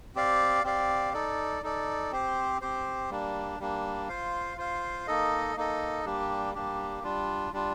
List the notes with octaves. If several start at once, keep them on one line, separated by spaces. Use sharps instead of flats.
C4 G4 D5 F5
C4 G4 D5 F5
D#4 A4 D5
D#4 A4 D5
C4 G4 C5
C4 G4 C5
G3 A#3 D4
G3 A#3 D4
F4 C5 F5
F4 C5 F5
A#3 D#4 A4 D#5
A#3 D#4 A4 D#5
G3 A#3 D4 G4
G3 A#3 D4 G4
G3 D4 F4
G3 D4 F4